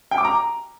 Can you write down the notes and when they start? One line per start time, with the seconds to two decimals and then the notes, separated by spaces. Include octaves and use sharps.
0.11 G5
0.18 D6
0.25 A#5